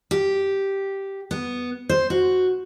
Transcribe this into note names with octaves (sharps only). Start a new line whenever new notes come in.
G4
B3
C5
F#4